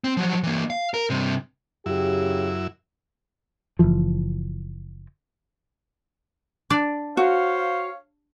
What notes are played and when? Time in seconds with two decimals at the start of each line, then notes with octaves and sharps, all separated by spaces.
0.04 C4
0.17 F3 F#3
0.43 E3 A#3
0.70 F5
0.94 A#4
1.10 G2 C3
1.86 F#2 C#3 E4 G4
3.79 F#1 C#2 E3 F3
6.70 D4 D5
7.17 F#4 C5 C#5 F5